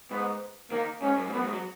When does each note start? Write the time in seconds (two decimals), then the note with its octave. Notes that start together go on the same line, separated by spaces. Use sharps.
0.11 G#2 B3
0.71 D#3 A#3
1.02 G#2 C#4
1.17 F#2
1.27 G#2
1.32 F#2 B3
1.43 G#2
1.52 F#3